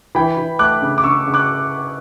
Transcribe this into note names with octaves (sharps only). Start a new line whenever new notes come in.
E3 G5 B5
E3
A3 D6 F#6
C#3
D6
C#3 C#6 E6
C#3
D6 F#6